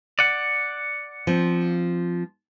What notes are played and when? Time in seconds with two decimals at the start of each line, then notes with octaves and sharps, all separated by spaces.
0.19 D5 F#5
1.27 F3 C4